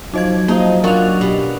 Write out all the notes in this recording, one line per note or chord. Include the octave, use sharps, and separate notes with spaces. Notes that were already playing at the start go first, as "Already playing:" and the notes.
F3 F#3 D#4 D#5 G#6
F3 A#3 D#4 D#5
C#4 D4 F4 F#4 A#4 F7
B2 G4